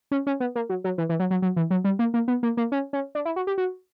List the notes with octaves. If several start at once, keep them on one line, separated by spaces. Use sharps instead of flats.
C#4
C#4
B3
A#3
F#3
F#3
E3
E3
F#3
F#3
F#3
E3
F#3
G3
A#3
A#3
B3
A#3
A#3
C#4
C#4
D4
E4
F#4
G4
F#4